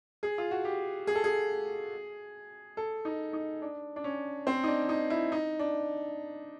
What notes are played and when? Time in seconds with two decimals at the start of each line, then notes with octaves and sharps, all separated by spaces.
0.23 G#4
0.38 F4
0.51 F#4
0.65 G4
1.07 G#4
1.15 A4
1.24 G#4
2.77 A4
3.05 D#4
3.33 D#4
3.62 D4
3.96 D4
4.04 C#4
4.47 C4
4.63 D#4
4.68 D4
4.89 D#4
5.10 E4
5.32 D#4
5.59 D4